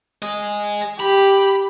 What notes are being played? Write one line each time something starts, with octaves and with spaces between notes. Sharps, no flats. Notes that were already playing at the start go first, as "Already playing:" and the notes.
G#4 D#5
G4 B5